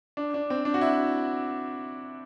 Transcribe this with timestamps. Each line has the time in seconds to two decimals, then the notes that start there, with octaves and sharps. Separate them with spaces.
0.17 D4
0.34 D4
0.50 C4
0.65 D4
0.74 F#4
0.81 E4